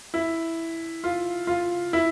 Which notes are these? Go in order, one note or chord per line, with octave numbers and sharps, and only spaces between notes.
E4
F4
F4
E4